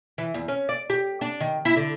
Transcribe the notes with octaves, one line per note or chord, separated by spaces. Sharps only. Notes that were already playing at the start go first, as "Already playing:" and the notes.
E3
E2
C#4
D5
G4
D4
D#3
E4
D3